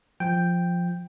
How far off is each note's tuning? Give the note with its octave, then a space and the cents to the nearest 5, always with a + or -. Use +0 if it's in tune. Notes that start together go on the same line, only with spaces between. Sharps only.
F3 +0 G5 +0